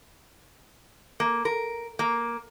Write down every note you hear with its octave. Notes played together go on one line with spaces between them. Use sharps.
A#3
A#4
A#3